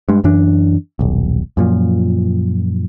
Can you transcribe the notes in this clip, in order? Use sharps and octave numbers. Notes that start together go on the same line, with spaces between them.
G2 G#3
F#2 E3 D4
D#1 B1
F#2 A#2 F3